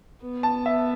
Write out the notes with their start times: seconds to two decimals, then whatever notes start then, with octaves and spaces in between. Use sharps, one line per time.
0.22 B3
0.43 A5
0.66 E5